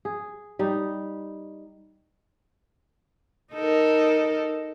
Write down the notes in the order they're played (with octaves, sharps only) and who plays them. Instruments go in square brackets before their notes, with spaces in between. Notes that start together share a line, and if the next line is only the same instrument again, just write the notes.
[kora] G#4
G3 D#4
[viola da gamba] D#4 A4 A#4